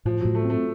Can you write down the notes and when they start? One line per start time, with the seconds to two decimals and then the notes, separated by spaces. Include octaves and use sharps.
0.05 A2 F3
0.21 A2 F#3
0.35 A3
0.45 C4
0.50 A3